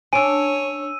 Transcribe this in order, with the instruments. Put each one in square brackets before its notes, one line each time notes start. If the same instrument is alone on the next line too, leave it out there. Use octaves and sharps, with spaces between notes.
[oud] C#4 D4 [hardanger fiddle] C#5 [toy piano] G#5 [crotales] E6 D#7